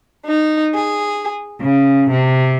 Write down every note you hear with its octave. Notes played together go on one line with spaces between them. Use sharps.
D#4
G#4
C#3
C3